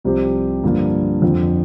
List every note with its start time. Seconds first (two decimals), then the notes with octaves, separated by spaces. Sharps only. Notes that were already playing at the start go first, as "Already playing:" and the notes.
0.04 C2 C3 F3 C4 G4
0.64 G2 D3 F3 A#3 D4
1.22 F2 D3 F3